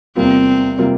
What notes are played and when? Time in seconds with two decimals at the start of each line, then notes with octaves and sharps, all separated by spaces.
0.16 E2 C3 G3 A#3 C4 F4
0.78 C3 G3 A#3 F4